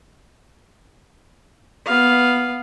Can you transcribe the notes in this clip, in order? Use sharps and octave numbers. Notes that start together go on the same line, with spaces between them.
B3 F5